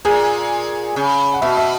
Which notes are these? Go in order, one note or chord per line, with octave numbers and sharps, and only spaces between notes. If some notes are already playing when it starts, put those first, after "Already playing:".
A#2 G#4
C#3
F#5
B2 E5
E5